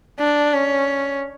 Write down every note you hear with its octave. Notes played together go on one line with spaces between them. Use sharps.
D4
C#4